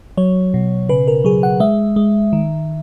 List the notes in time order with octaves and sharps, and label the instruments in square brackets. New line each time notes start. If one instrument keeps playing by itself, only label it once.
[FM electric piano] F#3 C#5
B2
C#3 B4
A#4
F#3 G#4
F#5
G#3 E5
G#3
D#3